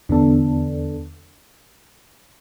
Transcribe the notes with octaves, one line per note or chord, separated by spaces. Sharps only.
E2 D3 B3 D4 A4